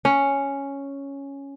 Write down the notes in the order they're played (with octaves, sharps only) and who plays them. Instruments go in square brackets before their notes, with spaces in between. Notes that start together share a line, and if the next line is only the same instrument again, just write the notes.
[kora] C#4